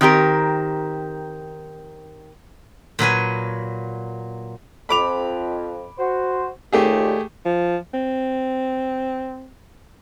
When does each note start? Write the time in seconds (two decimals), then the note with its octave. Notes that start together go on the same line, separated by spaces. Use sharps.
0.01 D#3 C4 G4 A#4
2.99 A#2 F#3 B4 G#5
4.89 F2 B5 D6 F7
5.98 F#4 C5
6.73 D#2 A#2 A3 G4 G#4
7.45 F3
7.94 C4